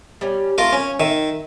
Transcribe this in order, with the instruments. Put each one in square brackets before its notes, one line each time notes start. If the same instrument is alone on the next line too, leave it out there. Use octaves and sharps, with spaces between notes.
[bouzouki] G3 C#4
[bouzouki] A3 [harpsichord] F4 A#4
[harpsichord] C#4 [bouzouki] C#5
[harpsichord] D#3 [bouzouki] E5